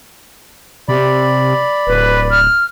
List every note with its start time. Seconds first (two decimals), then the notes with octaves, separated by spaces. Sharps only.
0.89 C3 D5 B5
1.87 D1 B4
2.31 F6